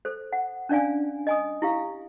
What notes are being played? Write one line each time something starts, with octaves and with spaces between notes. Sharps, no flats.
A4 C5
F#5
C#4 D4 D5 F5 G#5
D#5 G#5 D#6
E4 G4 F5